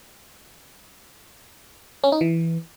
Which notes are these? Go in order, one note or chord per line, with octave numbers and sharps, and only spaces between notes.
C#4
D#4
E3